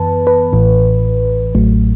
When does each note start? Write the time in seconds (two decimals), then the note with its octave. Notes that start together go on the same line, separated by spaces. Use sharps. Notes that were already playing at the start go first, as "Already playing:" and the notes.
Already playing: F#2 E3 B3 B4 A5
0.27 B4
0.53 A1 A2 E3
1.55 A1 A2 F#3 A3